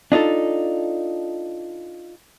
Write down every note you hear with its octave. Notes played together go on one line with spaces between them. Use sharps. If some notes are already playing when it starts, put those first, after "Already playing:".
D4 D#4 F4 A4